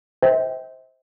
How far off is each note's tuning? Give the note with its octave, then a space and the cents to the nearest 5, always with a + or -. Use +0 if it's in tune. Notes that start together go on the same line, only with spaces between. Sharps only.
C5 +0 E5 -40 G5 +0